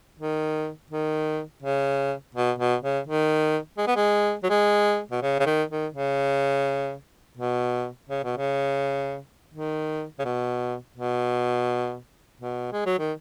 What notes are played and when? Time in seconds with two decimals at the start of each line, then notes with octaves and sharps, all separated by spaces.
0.20 D#3
0.91 D#3
1.63 C#3
2.35 B2
2.59 B2
2.83 C#3
3.07 D#3
3.78 G#3
3.87 B3
3.96 G#3
4.43 F#3
4.50 G#3
5.11 B2
5.22 C#3
5.40 C#3
5.46 D#3
5.70 D#3
5.94 C#3
7.37 B2
8.09 C#3
8.24 B2
8.37 C#3
9.54 D#3
10.19 C#3
10.25 B2
10.96 B2
12.41 B2
12.72 G#3
12.86 F#3
12.99 D#3